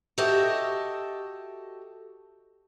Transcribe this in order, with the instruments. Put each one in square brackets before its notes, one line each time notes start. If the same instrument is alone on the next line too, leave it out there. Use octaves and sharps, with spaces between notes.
[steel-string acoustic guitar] F#4 G4 A4 D#5 E5